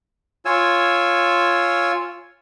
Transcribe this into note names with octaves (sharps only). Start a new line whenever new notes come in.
F4 C#5 G#5 E6